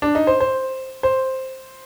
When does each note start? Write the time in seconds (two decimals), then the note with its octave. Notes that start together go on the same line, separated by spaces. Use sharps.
0.02 D4
0.15 D#4
0.27 C5
0.40 C5
1.03 C5